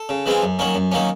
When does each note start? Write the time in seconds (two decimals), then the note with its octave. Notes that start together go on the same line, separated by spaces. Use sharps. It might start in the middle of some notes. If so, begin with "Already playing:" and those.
Already playing: A4
0.09 C#3
0.26 E3 G#3 C4 F4
0.42 F#2
0.59 D#3 F#3 A#3 C#4
0.75 F#2
0.92 D#3 F#3 A#3 C#4